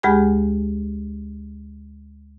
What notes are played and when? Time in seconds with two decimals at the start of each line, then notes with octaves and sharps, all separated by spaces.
0.03 D2 G#3 G4 G#4 G#5 B5